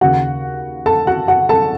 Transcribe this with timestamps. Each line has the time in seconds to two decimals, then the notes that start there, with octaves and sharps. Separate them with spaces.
0.01 D#2 C#3 F#4 F#5
0.86 A4 A5
1.07 F#4 F#5
1.28 F#4 F#5
1.49 A4 A5